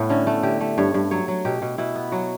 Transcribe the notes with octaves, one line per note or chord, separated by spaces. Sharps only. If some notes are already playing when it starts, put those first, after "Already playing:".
Already playing: A2 A3 B3
D3 C#4
A3
D3 G4
A3
G2 C#5
G2
F#3 C#5
F#3
B2 G4
B2
B2 E4
B3
F#3 F#4